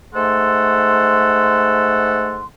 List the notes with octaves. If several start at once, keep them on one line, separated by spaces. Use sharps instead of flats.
G#2 A3 A4 F#5 C6